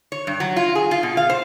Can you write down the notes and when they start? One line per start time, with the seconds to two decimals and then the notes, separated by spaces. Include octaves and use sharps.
0.12 C#5
0.27 G2
0.40 F#3
0.56 F4
0.75 G#4
0.91 F4
1.03 B2
1.17 F5
1.30 C5